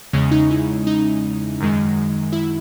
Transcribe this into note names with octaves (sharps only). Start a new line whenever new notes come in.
E2 C#3 G#3 C#4
D#4
E4
D#4
F#2 D#3 G#3
E4